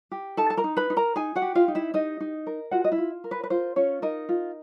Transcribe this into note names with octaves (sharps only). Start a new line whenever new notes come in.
G4
D#4 A4 A5
A5
A#4 A#5
D#4
B4 B5
D#4
A#4 A#5
D#4 G#4 G#5
F#4 F#5
G4
F4 F5
D#4
E4 E5
D#4 G4 D#5
D#4
A#4
F4 F#4 F#5
D#5
E4 E5
F4
A#4
B4
B4
F4 C5
C#4 F4 C#5
D#4 A#4 D#5
F4